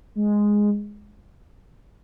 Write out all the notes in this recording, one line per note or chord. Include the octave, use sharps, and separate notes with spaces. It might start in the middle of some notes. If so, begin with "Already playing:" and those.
G#3